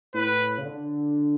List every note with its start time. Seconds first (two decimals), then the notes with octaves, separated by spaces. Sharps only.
0.14 A2 B4
0.58 C#3
0.65 D3